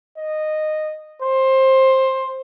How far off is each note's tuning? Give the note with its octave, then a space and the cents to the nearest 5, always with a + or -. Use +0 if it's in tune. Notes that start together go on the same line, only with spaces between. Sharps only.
D#5 -10
C5 +15